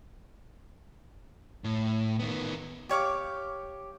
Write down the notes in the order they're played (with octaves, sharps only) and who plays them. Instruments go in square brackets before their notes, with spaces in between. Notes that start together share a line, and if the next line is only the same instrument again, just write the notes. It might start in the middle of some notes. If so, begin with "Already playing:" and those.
[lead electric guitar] A2
D#3 B3
[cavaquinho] G4 C#5 F5 D6